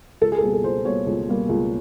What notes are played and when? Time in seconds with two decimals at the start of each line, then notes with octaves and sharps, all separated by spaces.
0.21 C#2 A4
0.32 G#4
0.38 A4
0.42 B2 G3 A#3 G#4
0.53 A4
0.64 C#2 C5
0.85 B2 G3 A#3 C#5
1.07 C#2
1.28 B2 G3 A#3
1.49 C#2